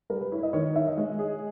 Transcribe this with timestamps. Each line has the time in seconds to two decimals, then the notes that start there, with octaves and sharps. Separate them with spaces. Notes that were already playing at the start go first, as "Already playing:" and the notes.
0.10 G3 A#4
0.21 B4
0.32 E4 C#5
0.43 D#5
0.53 D#3 C#5
0.75 D#4 E5
0.87 D#5
0.97 G#3 C#5
1.19 G#4